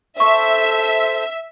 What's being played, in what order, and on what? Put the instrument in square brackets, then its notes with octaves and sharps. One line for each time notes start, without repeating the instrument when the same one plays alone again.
[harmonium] A4 C5 [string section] E5 [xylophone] C#6